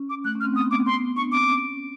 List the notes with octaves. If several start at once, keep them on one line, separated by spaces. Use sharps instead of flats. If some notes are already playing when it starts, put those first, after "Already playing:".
Already playing: C#4
D6
A3 F#6
C#4
F6
C4
B3 D#6
D6
C6
D4 C#6
C4 D6
C#4